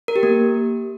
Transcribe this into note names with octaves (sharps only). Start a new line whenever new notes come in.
A#4
G4
A#3